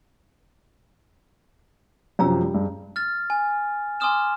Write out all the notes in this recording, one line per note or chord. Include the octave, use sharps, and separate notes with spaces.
F#2 C3 F3 C#4 A#5 E6
G3
G2 G#3
F6 A6
G#5
G#5 C6 D6 D#6 F6 E7